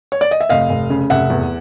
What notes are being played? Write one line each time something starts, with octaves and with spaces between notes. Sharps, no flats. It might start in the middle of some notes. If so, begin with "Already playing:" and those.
C#5
D5
D#5
E5
F1 D#5 F5
F1
C#3
F1 E5 F#5
E2